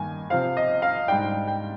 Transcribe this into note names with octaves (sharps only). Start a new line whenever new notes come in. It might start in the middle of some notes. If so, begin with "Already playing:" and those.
Already playing: G2 D#3 A#3 G#5
C3 F3 C4 F5
D#5
F5
G#2 G3 D4 G5
G5